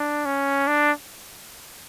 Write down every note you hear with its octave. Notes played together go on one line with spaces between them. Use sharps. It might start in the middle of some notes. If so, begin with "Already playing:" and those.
Already playing: D4
C#4
D4